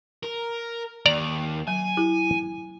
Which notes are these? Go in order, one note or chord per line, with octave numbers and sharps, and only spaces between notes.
A#4
D#2 D5 A#5
F#3 G#5
E4 G4